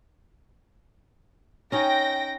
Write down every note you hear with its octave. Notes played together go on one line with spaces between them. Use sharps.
C#4 D#4 C#5 G5 A#6